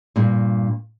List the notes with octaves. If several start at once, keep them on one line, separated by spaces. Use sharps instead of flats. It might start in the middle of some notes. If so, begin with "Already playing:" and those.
G2 A#2